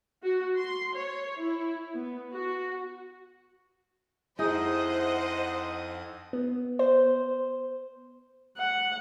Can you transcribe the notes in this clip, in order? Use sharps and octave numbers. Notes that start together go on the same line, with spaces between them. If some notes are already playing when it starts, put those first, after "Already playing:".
F#4
C6
C#5
E4
B3
F#4
F2 D#4 E4 G#4 C5 D#5 F#5 D#6
B3
C5
F#5